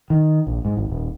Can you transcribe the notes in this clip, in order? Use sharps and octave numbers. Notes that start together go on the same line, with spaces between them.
D#3
A#1
G#2
G#1
D#1